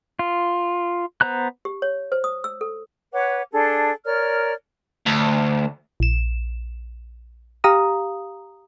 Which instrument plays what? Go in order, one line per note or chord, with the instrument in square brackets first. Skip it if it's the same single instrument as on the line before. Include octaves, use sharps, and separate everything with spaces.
[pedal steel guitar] F4
B3 C5 A#5 F#6
[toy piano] G4
C#5
C5
D#6
E6
A4
[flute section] B4 C#5 F#5 D6
D4 G#4 A4
A#4 C#5 D5 F6
[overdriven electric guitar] D2
[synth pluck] A#1 E7
G4 F5 A#5 D#6